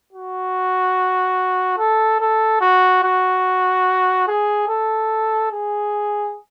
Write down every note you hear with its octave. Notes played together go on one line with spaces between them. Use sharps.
F#4
A4
A4
F#4
F#4
G#4
A4
G#4